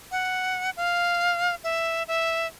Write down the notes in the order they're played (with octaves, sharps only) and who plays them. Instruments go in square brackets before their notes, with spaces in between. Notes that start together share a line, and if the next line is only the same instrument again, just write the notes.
[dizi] F#5
F5
E5
E5